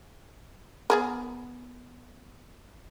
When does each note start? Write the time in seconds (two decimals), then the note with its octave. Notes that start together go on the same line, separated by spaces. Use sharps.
0.90 B3 G#4 A#4